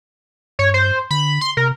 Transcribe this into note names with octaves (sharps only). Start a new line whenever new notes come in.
G2 C#5
C5
D3 B5
C6
C3 A#4